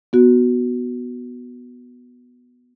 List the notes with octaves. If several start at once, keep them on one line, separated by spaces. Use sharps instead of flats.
B3 F#4